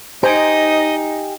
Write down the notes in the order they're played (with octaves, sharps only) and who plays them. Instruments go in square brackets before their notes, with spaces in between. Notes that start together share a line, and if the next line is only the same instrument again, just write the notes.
[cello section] D#4 [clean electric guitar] G4 G#5 [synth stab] C5 D7 [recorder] D#5